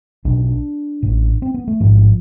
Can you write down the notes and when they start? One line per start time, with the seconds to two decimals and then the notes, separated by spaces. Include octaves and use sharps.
0.25 B1 B2 D4
0.45 D4
1.02 A1 A2
1.42 C4
1.54 B3
1.68 A3
1.80 A1 G#2 F3